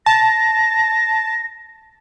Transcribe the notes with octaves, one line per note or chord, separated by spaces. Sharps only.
A5 A#6